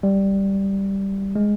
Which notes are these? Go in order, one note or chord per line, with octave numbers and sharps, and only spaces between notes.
G3
G#3